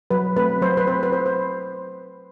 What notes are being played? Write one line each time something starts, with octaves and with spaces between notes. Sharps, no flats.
F#3 B4
A3 C4 B4
F#3 C5
B4
A3 C4 C5
B4
F#3 C5
C5